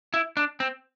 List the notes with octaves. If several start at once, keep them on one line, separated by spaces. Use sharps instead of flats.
E4
D4
C4